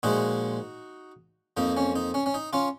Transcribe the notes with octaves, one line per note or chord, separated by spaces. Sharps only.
A#2 F3 G#3 D#4 F#4
F2 F3 A#3 D#4
C#4
D#4
C#4
C#4
D#4
C#4 F4